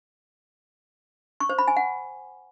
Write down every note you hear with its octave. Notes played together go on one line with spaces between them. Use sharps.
C#6
C5
B5
G#5
F#5